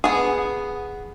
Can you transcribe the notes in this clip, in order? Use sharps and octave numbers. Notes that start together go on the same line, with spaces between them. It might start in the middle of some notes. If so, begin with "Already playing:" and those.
B3 G#4